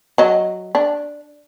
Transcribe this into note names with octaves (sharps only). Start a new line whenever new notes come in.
F#3 D#5
D4